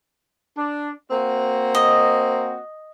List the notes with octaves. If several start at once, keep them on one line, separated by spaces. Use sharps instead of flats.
D4
A#3 C4 F#4
D#5